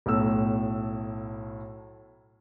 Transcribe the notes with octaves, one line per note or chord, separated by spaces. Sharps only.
B1 A2 E6